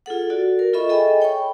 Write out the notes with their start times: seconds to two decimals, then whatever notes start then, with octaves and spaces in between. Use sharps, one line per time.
0.06 F4 G#4 A4 F#5
0.30 F#4 A4 D5
0.59 A#4
0.73 F4 A4 D#5 E5 B5 C#6
0.89 G#4 A4 D#5 E5 G5 G#5
1.20 C#5 G5 B5 C#6